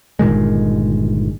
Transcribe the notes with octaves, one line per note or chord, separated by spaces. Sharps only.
G1 A#2 D#3 G#3